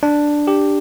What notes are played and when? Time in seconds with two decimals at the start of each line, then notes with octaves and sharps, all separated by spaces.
0.03 D4
0.47 G4